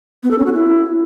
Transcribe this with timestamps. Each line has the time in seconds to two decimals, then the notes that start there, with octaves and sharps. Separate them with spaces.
0.23 B3
0.31 A4
0.38 C#4
0.46 F#4
0.54 E4